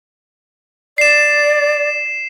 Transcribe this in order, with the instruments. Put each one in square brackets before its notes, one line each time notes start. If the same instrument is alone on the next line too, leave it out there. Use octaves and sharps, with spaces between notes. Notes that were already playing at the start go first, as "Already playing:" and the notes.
[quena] D5 [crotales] C7 E7